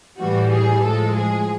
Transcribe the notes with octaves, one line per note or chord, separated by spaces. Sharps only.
A2 E3 G3 F#4
G#4
A2 F3 G#3 A4
G#4